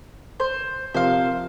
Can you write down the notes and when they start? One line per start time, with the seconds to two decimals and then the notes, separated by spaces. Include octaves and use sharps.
0.40 C5
0.94 C3 F3 A#4 C5 F5